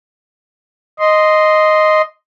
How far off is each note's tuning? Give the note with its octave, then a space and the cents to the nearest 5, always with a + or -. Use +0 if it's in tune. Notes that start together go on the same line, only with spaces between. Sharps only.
D#5 +0 C6 -5